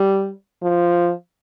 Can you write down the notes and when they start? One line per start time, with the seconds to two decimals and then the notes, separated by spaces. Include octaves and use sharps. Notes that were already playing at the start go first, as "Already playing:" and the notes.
Already playing: G3
0.63 F3